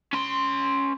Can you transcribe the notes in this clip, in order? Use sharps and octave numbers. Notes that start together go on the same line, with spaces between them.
C#4 C6